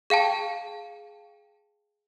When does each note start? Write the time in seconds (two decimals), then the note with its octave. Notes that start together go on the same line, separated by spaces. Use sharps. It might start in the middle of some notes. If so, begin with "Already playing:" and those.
0.10 G#4 F5 G5 A5